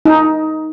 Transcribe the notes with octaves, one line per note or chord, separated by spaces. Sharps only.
D#4